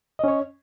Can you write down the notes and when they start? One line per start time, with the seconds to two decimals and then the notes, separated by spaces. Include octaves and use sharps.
0.19 D#5
0.24 C#4
0.28 C#5